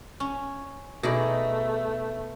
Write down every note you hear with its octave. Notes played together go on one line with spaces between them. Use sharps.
C#4
B2 A3 D#4 G#4 D5